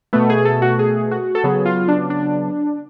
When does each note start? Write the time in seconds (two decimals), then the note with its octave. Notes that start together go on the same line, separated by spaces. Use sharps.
0.13 B2 A3 B3
0.30 G#4
0.45 A4
0.62 F#4
0.79 G#4
1.11 F#4
1.35 A4
1.44 C#3 F#3 B3 G#4
1.66 F4
1.88 D4
2.10 D4